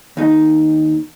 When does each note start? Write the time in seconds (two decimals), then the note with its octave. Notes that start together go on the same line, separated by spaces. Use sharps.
0.17 D#2 D#4